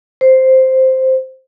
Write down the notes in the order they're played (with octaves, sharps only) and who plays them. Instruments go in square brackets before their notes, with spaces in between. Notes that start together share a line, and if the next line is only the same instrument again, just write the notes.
[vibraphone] C5